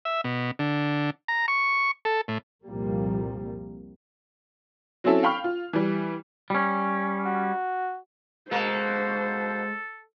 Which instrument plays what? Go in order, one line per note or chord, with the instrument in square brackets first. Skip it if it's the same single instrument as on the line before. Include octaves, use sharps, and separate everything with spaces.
[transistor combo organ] E5
B2
D3
A#5
C#6
A4
A2
[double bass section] C2 F2 A#2 F3 G3 A#3
[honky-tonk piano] F#3 C4 C#4 E4 A4
F5 G5 B5 C#6 F6
F4
E3 G3
[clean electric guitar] G3 C#4
[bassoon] F#4
[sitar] B2 A#3 [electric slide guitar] G#3 [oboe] A4 [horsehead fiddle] C5